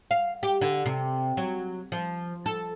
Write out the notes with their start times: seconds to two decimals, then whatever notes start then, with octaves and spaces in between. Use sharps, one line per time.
0.11 F5
0.43 G4
0.61 D3
0.86 C3
1.37 F#3
1.92 F3
2.46 A4